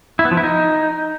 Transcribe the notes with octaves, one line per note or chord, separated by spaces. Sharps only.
E4
B3
F3
E4
D#4